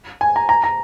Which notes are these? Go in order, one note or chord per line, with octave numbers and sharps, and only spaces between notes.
G#5
A#5
A#5
A#5